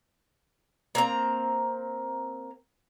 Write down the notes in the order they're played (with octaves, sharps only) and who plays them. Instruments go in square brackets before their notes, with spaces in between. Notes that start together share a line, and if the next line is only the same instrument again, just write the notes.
[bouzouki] A#3 C4 A#5